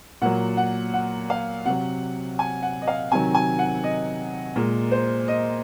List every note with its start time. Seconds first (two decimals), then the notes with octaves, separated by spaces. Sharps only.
0.22 A#2 F#3 F#5
0.57 F#5
0.94 F#5
1.30 F5
1.66 C3 F#3 F#5
2.39 G#5
2.63 F#5
2.82 D#5
2.88 F5
3.11 C3 D#3 F#3 G#5
3.35 G#5
3.59 F#5
3.84 D#5
4.56 A#2 G#3 A#4
4.91 C5
5.28 D#5